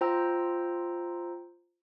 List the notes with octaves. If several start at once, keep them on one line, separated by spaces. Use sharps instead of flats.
F4 C5 G5 A#5 E6